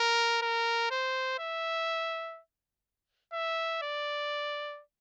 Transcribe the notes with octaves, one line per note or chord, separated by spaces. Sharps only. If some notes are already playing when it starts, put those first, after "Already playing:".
Already playing: A#4
A#4
C5
E5
E5
D5